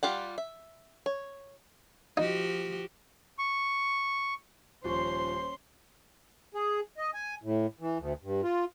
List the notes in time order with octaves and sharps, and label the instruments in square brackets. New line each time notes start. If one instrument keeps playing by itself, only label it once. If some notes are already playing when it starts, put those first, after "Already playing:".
[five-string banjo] G3 F4 G4 F#5
E5
C#5
[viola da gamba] F3 F#4 G4 [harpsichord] D#4
[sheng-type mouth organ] C#6
[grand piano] D#1 F3 C#6 [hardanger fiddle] C#4 C6 [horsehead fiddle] C5
[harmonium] G#4
D#5
G#5
A2
E3
D2
G2
F4